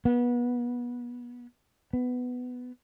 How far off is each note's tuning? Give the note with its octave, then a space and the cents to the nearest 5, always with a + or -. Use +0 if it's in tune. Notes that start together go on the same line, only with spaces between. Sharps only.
B3 -25
B3 +10